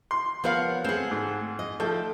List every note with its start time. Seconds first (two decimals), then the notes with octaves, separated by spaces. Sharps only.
0.11 C6
0.44 F3 B3 A#4 C#5 F5 F#5
0.84 A3 C4 G#4 F#5
1.11 G#2
1.59 D#5
1.80 F3 A3 A4 G5